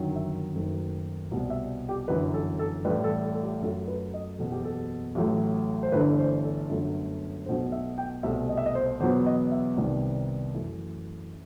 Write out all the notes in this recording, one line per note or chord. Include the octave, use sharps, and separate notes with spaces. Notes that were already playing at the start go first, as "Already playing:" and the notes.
Already playing: G1 F#2 D#3 F#3
E5
F#1 F#2 D#3 A3
C2 B2 G3
E5
G4
G1 F#2 E3 B4
A4
A4
A1 A2 G3 B4
A4
A4
A4
G4
F#2 F#3 A3 A4
B4
D#5
F#1 E2 B2 A4
G4
A4
A1 A2 F#3 A3
C5
G1 G2 E3 A3 B4
C5
A4
G1 F#2 F#3 A3
B1 B2 A3 C5
E5
G5
C2 B2 A3 E5
D#5
E5
D#5
C5
E2 B2 F#3 B3 C5
D#5
E5
C2 C3 D#3 G3 B3
F#2 E3 A3